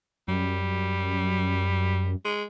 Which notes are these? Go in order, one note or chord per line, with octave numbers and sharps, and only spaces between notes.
F#2 G3
G#3